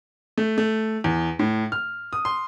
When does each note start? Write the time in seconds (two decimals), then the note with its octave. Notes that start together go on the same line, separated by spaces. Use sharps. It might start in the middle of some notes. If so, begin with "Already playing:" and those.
0.38 A3
0.58 A3
1.04 E2
1.39 A2
1.72 F6
2.13 D#6
2.25 C6